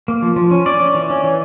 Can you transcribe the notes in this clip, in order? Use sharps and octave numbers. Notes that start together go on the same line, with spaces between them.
A#3
F3
F3
C#4
C#4 D5
C#4
E3
C#4
E3